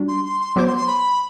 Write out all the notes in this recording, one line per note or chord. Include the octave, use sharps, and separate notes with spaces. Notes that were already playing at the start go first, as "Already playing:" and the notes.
Already playing: G3 D4 F#4
C6
C6
C6
F#3 B3 F#4 C5 D6
C6
C6
B5